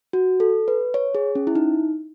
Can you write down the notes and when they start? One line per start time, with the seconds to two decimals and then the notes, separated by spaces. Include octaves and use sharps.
0.13 F#4
0.40 A4
0.68 B4
0.94 C#5
1.15 G#4
1.35 C#4
1.47 E4
1.55 D#4